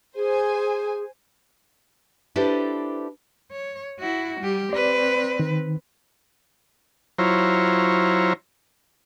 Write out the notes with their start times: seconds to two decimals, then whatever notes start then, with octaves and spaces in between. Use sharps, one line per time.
0.16 G#4 C5 G#5
2.36 D4 E4 G4 A4 B4 C5
3.52 C#5
3.99 E4 F#4
4.41 G3 G4
4.73 C4 B4 D5
5.40 D#3
7.18 F#3 E4 F4 C5 C#5 A#5